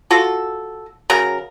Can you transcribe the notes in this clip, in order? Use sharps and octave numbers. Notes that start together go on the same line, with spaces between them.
F4 F#4 A4
C#3 F#3 A#4